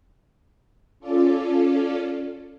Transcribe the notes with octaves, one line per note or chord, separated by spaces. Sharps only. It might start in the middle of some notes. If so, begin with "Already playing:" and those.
C#4 F4 A4 D5